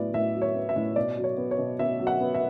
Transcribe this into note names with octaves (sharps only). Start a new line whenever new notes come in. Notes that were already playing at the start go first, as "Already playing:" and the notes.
Already playing: A2 F#3 B3 D5
A2 E5
F#3
C#5
B3
E5
A2
B2 D5
F#3
C#5
B3
C#5
B2
B2 E5
F#3
F#5
B3
E5